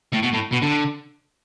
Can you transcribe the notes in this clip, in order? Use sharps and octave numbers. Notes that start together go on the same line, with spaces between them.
A2
B2
A2
B2
D3